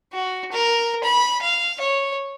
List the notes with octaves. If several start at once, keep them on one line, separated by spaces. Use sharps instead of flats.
F#4
A#4
B5
F5
C#5